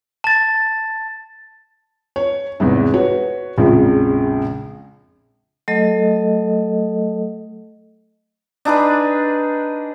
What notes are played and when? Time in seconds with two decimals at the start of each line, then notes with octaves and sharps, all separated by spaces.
0.24 A5 A6
2.16 C#5
2.60 E2 G#2 C3
2.94 F#4 B4 C#5
3.58 A#1 F2 A#2 C#3 G#3
5.68 F#3 A3 A4 D#5
8.65 D4 D#4 G#4 B4